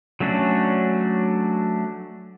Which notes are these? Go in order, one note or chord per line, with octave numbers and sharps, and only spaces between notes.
F#3 A3 C#4 D4 F#4